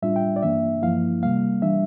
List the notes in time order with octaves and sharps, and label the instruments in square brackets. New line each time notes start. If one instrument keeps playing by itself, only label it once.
[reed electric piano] A2 G3 D4 F4 E5
G5
D5
G2 E3 A#3 D4 E5
G2 F3 A#3 E4 F5
C3 G3 A#3 F5
E3 G3 D4 E5